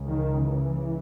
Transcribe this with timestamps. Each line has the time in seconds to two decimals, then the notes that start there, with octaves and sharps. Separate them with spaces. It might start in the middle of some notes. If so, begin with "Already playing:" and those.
Already playing: C#2 C#3
0.09 D#3
0.44 E3